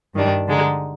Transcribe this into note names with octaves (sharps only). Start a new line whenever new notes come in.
G2 D#3 G3 D4
D3 G#3 D#4